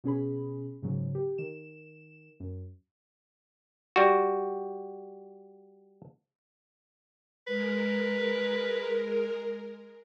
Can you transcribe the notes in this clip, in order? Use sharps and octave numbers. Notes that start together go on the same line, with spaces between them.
B2 C#4 G#4 B5
G#2 C#3 F#3
G4
D#3 E7
F#2
G3 F#4
G#3 A#4 B4